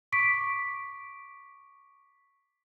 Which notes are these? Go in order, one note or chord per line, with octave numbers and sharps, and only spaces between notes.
C#6 D6 B6 D7